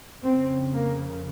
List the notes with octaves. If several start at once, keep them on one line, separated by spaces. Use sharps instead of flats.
F2 C#3 C4
A#3